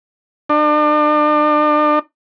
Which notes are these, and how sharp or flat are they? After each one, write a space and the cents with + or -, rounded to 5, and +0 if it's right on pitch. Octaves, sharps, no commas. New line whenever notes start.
D4 +40